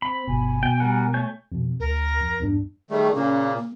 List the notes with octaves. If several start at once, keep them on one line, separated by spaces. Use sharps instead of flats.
C4 B5
G1 B2 G#5
B2 G5
G3 A#4 F#5
A3 C#5 G6
F2 B2
D2 A#4
F2
E2 G2 D4
D#3 G3 A3 G#4
A#2 C#3 A#3 C#4
A#3